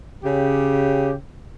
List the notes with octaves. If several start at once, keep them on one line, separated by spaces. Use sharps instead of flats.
C#3 G4